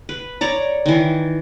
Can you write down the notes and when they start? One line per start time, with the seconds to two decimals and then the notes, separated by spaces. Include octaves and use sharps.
0.09 B4
0.41 C#5 D5 A#5
0.86 D#3 E3